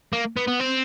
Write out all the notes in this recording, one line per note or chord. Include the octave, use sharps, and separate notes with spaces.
A#3
B3
B3
C4